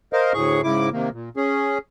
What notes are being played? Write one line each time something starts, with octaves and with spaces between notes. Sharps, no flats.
A#4 C5 D#5 F5
D2 A2 G#4 C#6
G#2 C#3 E4 D6
C3 D#3 A#3
A#2
C#4 G#4